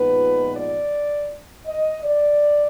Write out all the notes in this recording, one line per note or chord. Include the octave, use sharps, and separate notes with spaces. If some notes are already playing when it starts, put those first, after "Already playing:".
Already playing: A#2 F3 G#3 B3 D#4 B4
D5
D#5
D5